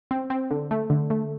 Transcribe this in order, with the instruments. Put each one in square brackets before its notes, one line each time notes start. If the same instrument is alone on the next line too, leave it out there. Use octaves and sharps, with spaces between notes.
[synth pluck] C4
C4
D3
A3
D3
A3